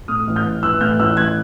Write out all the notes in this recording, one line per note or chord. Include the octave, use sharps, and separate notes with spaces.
A2 D#6 F6
A1
F6 G6
A1
E3 E6 F#6
A2 F6 G6
A1 E6 F#6
A1 F#6 G#6